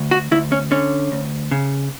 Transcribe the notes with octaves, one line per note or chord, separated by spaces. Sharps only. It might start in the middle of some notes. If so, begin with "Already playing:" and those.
Already playing: D2
F#4
D2 E4
C#4
D3 C#4
D2
C#3